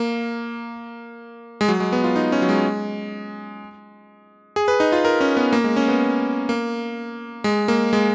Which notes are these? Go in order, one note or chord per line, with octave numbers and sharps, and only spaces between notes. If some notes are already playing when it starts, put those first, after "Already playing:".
Already playing: A#3
G#3
F#3
G#3
B3
F4
D#4
C#4
F#3
G#3
G#4
B4
D#4
F4
A#4
C#4
B3
A#3
G#3
C#4
B3
A#3
G#3
A#3
G#3